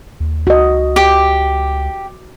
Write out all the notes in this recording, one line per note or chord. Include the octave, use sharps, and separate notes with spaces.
D#2
C#2 F#4 D#5
G4